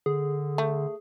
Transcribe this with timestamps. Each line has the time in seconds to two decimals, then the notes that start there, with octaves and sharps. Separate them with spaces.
0.06 D3 G#4
0.58 A3